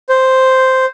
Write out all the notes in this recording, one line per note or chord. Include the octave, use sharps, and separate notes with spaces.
C5